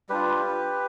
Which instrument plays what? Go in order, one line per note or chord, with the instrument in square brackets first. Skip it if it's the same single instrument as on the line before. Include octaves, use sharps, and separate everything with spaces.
[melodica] G3 D4 F4 G4 B4